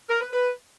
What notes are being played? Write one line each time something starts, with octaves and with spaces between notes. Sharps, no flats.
A#4
B4
B4